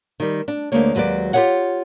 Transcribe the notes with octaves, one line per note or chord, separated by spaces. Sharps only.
D#3 G3
D4
D2 G#2 D3 G#3 A#3 C#5
D#2 F#3 G#3 B4 D5
F4 G4 G#4 B4 C#5 F#5